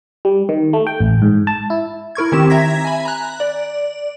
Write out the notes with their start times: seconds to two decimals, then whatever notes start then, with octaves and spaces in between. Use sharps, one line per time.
0.25 G3
0.49 D#3
0.73 A3
0.87 G5
1.00 A1
1.22 G#2
1.47 A5
1.70 E4
2.15 E4 A#4 C#6 G#6
2.32 D#3 C4 G4 E7
2.50 E5 A#5 G#6 A#6 B6
2.85 G#5 B5
3.05 A#5 F#6
3.40 D5